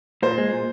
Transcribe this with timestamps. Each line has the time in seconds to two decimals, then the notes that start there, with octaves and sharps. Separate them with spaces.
0.22 A#2 C5
0.38 G#3
0.52 A#2